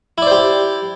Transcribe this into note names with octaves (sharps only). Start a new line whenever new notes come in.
E4 G4 C5 D5